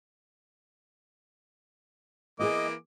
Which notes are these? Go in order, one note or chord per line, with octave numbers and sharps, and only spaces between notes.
E3 A#3 B3 G4 G#4 D#5 D6